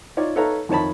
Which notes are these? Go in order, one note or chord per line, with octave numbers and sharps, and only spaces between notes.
D#4 F4 C#5 D5
D#4 A4 B4 C#5 F5 A#5
F2 D#3 C#5 A5 B5